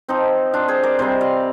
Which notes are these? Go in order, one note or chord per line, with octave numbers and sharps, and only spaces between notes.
F3 C4 D#4
D4 F4
G#4 C5
A#4 D5
C3 G3 C4 C5 D#5
D5 F5